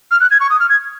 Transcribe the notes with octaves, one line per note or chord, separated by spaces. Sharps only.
F6
F#6
G#6
C#6
D#6
F6
G#6